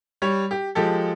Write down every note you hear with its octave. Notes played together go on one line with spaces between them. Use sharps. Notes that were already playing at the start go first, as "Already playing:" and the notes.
G3 C#5
G4
F3 G#3 G4 A4